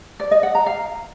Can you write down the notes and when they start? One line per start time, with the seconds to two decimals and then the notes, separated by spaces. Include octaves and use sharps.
0.20 D5
0.31 D#5
0.43 F#5
0.55 A#5
0.66 F5